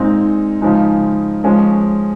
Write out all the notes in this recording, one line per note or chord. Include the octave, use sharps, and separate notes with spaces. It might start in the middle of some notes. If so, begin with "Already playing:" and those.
Already playing: A#2 G#3 C4 D#4
C#3 F3 G#3 D#4
F3 G#3 C#4